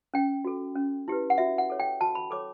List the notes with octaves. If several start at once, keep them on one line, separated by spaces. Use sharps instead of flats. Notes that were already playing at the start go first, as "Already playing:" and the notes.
C#4 G5
F#4 A4
C#4
E4 G4 B4
F#5
F#4 E5
F#5
A4 C#5
G5
F#4 A5
B5
A4 C#5 D6